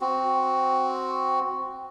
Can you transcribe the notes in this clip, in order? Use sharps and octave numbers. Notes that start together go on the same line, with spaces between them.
C4 F#4